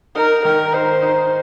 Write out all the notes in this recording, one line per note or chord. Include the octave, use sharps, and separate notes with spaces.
D#4 A#4
D#3 A#4
D#4 C5
D#4